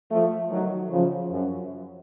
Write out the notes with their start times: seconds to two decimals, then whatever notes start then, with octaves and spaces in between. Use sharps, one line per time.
0.11 F3 A3
0.51 D#3 F#3
0.91 C#3 F3
1.32 F#2